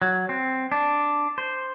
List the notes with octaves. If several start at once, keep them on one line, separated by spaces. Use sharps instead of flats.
F#3
C4
D4
C5